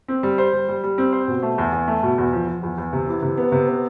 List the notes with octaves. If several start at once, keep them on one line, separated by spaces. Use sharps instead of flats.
C4
G3
C5
G3
G3
G3
C4
C5
B2
A3
E2
E2
A3
B2
E2
F3
F3
E2
E2
C3
E3
C3
B3
C3
B3